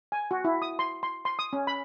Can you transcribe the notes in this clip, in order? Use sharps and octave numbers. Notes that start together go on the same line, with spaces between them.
G#5
F#4
E4
D#6
C6
C6
C6
D#6
C#4
B5